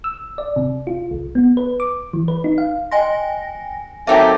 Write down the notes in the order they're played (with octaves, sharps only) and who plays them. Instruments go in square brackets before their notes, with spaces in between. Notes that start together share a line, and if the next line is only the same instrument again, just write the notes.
[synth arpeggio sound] E6
D5
C3
F4
C2
B3
B4
D6
E3
B4
D#4
F5
[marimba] D#5 C6 [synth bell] G5 G#5 A#6
[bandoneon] F#3 C4 A4 [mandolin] A#3 D#4 G4 [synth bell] E5